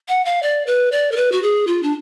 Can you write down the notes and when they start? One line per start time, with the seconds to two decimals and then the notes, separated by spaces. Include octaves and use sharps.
0.09 F#5
0.25 F5
0.43 D5
0.67 B4
0.92 D5
1.12 A#4
1.16 B4
1.32 F#4
1.43 G#4
1.67 F4
1.83 D4